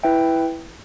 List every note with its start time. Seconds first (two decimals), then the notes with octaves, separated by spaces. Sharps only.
0.03 E4 B4 E5 G5